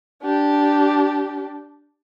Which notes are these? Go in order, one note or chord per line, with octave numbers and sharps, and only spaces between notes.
D4 G4